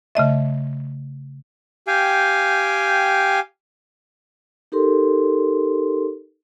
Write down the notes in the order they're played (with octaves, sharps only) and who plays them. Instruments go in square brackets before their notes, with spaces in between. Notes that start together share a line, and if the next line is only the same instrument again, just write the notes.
[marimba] C#3 A3 D#5 E5
[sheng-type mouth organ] G4 F5 G5 G#5
[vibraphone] D#4 G4 A4 A#4 C6